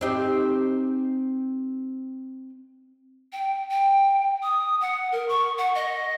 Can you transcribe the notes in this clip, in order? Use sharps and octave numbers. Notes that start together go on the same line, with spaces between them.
C4 D#4 G4
G5
G5
D#6
F#5
A#4
C#6
F#5
D#5